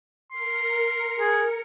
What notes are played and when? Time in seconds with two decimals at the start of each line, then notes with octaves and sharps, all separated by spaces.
0.32 A#4 C6 C#7
1.20 G#4